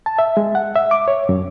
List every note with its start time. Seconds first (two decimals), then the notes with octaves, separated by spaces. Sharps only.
0.06 A5
0.19 E5
0.37 G#3
0.55 F#5
0.76 E5
0.91 D6
1.08 C#5
1.29 F#2